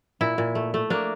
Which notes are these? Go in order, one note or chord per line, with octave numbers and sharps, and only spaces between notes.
A#2 E4
A#2
A3
A3
A#3 D4